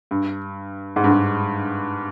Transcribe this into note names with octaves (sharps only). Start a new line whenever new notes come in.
G2
G#2
G2
G#2